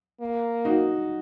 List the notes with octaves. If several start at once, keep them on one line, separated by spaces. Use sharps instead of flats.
A#3
D#4 F#4